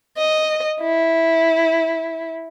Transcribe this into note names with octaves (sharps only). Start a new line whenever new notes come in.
D#5
E4